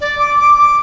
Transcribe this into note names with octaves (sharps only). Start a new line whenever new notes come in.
D5
D6
D6
D6